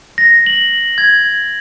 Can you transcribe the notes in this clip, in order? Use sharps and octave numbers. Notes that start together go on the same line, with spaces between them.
A#6
F#7
G#6